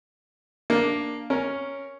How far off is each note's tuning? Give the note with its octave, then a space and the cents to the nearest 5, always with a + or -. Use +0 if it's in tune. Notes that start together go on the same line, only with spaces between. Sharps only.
A#3 +0 D4 +0
C#4 +0 A#4 +0